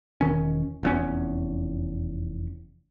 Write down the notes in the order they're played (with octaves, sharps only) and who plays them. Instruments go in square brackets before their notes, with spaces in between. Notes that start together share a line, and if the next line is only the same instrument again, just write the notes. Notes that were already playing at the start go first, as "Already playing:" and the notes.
[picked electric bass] E1 D#3 C#4
F1 E2 C#4